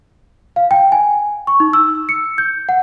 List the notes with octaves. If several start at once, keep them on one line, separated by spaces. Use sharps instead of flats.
F5
G5
G#5
C#6
D#4
E6
C#7
G6
F#5